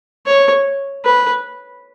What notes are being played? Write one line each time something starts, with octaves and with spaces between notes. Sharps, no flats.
C#5
B4